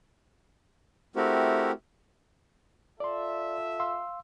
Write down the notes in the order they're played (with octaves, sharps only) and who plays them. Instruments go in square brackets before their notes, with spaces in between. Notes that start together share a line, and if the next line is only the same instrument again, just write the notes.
[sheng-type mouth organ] A3 C4 E4 F#4 G4 A#4
[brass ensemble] F4 A4 E5 [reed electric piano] D5 C6
[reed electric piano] F5 C6 E6